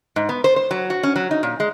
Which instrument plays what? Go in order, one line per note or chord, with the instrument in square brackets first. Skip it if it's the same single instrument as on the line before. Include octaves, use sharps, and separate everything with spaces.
[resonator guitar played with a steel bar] G#2
B3
C5
C5
F#3
F#4
C#4
F#3
D#4
A#2
G#3